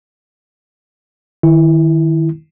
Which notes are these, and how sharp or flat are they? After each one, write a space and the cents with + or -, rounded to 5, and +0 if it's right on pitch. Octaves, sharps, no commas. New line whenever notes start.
D#3 +0 E4 +0